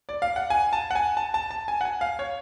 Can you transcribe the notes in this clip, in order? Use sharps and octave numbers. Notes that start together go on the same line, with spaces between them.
D5
F5
F#5
G#5
A5
F#5
G#5
A5
A5
A5
G#5
F#5
G#5
F5
C#5